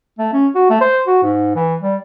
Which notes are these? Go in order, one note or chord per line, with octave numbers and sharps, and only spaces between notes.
A3
C#4
F#4
A3
C5
F#4
G#2
E3
G3